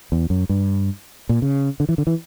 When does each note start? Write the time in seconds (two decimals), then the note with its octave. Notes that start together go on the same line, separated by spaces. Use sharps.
0.12 E2
0.30 F#2
0.49 G2
1.29 A#2
1.42 C#3
1.80 D3
1.89 E3
1.98 D3
2.07 E3